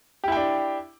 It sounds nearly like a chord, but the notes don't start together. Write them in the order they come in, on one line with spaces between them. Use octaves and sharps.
G4 E4 G5 D4